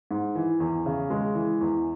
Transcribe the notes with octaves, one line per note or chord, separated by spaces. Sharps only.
G#2
E3
E2
C#3
G#3
E3
E2